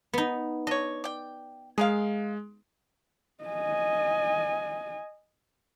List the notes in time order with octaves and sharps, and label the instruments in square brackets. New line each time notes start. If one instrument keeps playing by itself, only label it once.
[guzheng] B3 D#4
[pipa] D4 C#5 [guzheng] D#5
[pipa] D5 G5
[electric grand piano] G#3 [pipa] G#4 A#4 F5
[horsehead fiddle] D#5 G#5